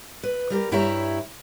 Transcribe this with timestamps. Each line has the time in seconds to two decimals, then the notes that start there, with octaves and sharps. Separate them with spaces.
0.23 B4
0.50 G3 G4 A#4
0.72 G2 E4 G4 C#5 E5 A#5